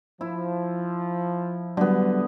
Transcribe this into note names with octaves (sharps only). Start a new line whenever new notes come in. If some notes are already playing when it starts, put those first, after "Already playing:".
F3 E4
D3 F#3 G3 B3